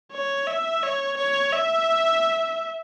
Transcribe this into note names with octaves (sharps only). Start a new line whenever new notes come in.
C#5
E5
C#5
C#5
E5